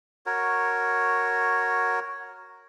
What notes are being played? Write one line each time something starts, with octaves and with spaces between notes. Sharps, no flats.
F#4 A#4 C#5